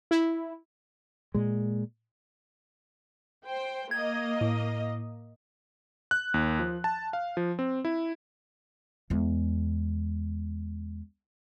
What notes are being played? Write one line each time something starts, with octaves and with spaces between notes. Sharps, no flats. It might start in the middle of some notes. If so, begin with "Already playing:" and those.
E4
A#2 G#3
C5 G5
A#3 D#5 G#6
A2
F#6
D#2
F3
A5
F5
F3
C4
E4
E2 G#3